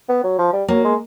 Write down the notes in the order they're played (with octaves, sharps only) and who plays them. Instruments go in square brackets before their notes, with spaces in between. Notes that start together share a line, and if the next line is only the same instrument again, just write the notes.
[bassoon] B3
F#3
F3
G3
[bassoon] F#3 [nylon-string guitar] A#3
[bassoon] G#3